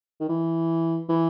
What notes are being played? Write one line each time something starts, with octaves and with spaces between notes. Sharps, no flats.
D#3
E3
E3